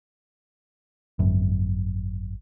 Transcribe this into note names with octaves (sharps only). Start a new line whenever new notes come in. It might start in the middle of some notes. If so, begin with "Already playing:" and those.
G#1 F#2